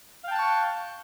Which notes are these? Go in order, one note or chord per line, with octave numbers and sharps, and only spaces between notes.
F5 G5 A5 C#6 F#6